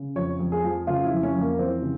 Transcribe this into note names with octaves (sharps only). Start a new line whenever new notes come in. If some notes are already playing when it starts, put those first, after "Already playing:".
Already playing: C#3
F2 C#5
F2
G#4
F3
C#3 F4
E4
F2
C#4
F2
A#3
E3 C4
C#3